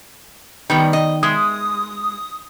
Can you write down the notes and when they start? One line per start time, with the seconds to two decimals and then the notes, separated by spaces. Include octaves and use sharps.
0.70 D#3 G3 B3 G5
0.93 D#5
1.23 G#3 E5 D#6